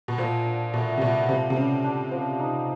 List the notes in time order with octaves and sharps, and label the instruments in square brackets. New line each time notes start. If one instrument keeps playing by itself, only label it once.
[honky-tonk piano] B2
[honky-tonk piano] A#2 [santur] F3
[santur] D4
[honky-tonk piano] B2 [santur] A3
[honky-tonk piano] C3
[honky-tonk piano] B2 [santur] D4
[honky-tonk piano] C3 [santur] F3
[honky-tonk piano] C3
[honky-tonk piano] C#3 [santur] F3
[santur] D4
F3
D#4